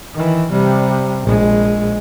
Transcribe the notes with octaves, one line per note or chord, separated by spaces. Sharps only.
D#3 E3
C3 G3
A#1 G#3